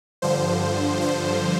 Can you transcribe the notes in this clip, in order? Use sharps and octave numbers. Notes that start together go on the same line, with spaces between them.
G2 D3 F3 C5
C5